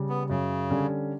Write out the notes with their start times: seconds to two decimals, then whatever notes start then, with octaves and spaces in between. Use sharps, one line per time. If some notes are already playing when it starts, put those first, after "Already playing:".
Already playing: C#3 G3
0.09 B3
0.29 F#2 C#3
0.70 D3 G3 C#4